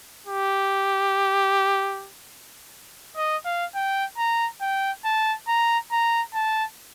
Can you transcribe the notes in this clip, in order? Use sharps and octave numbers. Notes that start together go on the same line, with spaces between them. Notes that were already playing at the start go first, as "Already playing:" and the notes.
G4
D#5
F5
G5
A#5
G5
A5
A#5
A#5
A5